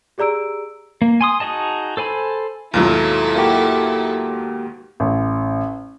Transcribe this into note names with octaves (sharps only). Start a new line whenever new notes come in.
G4 G#4 D5 A#5 E6 D7
A#3
G#5 C6 D#6
D#4 F#4 G#4 D#5 A5
A4 C5 G#5 B5
D#2 G#2 B2 F#3 E4 F4 A4
A#3 F#4 G4
A1